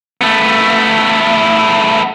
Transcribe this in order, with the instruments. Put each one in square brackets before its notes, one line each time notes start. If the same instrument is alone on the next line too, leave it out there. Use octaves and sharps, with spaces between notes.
[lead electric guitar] A3 B3